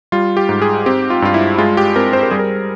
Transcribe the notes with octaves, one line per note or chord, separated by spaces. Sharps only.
G3 F4
G4
G#2
G#4
C4 G4
F4
G2 F4
E4
G#3 F4
G4
C4 A#4
C5
A#4
G3 G#4
A#4